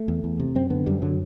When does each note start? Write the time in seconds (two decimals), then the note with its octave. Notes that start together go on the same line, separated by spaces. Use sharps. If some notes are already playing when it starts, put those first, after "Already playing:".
Already playing: A3
0.08 E2
0.24 E2
0.40 C3
0.55 F#2 C4
0.70 D3 B3
0.86 F#2 G3
1.02 D3 F#3